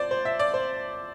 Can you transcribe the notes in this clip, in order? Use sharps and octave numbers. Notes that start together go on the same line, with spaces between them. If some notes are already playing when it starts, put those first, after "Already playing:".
Already playing: C5 D5
C5
E5
D5
C5